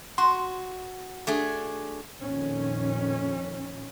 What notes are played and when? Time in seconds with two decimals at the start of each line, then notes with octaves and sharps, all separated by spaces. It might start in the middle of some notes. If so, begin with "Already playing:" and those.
0.18 F#4 C6
1.27 A3 D4 G#4
2.20 A#1 F2 A#2 D#3 C#4